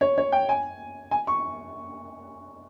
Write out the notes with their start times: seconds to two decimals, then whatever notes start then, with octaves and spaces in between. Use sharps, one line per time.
0.01 C#5
0.18 C#5
0.32 G5
0.49 G#5
1.11 G#5
1.27 C#6